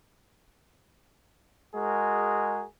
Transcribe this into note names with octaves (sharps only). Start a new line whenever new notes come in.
G#3 F#4 G#4 A#4